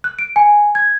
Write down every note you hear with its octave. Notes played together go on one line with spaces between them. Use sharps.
F#6
D7
G#5
G#6